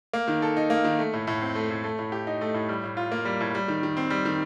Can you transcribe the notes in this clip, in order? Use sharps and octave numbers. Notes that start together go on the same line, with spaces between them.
A#3
D#3
A4
D#4
A#3
D#3
A3
A2
A2
C4
A3
A2
A3
A2
G4
D#4
A3
A2
G3
A2
F4
A#3
G3
A2
G3
D#3
D#3
C4
G3
D#3